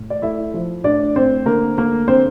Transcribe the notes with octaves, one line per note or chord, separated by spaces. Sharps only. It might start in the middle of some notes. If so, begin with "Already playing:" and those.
Already playing: A2
D5
A3 E4 E5
F3
A2 D4 D5
A2 C4 C5
D3 A#3 A#4
A3 A#3 A#4
D3 C4 C5